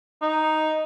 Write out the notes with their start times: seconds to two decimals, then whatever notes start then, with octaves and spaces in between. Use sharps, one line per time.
0.22 D#4